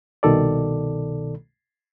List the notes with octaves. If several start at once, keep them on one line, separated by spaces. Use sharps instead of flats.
C2 B2 D#3 A4 D5